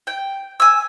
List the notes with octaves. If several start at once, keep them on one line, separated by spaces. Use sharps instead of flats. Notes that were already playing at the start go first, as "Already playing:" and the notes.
G5
G#5 E6